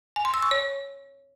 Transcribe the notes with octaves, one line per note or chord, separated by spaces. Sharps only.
G#5
C6
E6
C#6
C#5